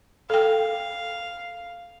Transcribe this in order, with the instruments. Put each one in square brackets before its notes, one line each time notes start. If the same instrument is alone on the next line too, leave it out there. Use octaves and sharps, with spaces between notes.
[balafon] A4 G5 [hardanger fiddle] F5